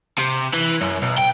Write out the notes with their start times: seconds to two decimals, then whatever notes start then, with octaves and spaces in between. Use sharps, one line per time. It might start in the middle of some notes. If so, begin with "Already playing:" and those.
0.18 C3
0.53 E3
0.81 F#2
1.03 B1
1.18 G5